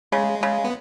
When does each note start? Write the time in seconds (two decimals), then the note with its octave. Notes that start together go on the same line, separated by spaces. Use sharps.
0.12 C#3 G#3
0.43 C#3
0.65 B3